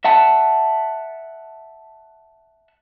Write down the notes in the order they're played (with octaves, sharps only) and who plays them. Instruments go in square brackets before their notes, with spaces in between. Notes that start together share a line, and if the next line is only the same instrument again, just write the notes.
[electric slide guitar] E5 F#5 A5